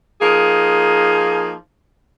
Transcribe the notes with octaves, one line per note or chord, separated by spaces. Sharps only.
F3 A#3 D#4 G#4